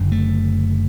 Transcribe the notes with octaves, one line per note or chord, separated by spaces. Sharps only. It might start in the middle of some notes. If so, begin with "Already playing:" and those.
Already playing: F#1 F#2 D3
A3